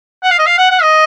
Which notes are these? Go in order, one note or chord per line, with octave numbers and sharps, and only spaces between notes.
F#5
F5
D#5
F5
F#5
F#5
D#5